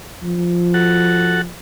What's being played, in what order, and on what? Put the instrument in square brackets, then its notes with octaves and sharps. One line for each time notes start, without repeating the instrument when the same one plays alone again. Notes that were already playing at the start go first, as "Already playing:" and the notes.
[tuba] F3
[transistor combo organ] F#4 A4 F#5